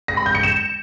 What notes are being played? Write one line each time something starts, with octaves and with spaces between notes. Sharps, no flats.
A#6
B5
G6
C#7
E7